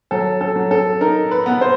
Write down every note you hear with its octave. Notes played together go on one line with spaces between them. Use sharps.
F#3 A4
A4
F#3
A4
D#4 A#4
B4
B3
C5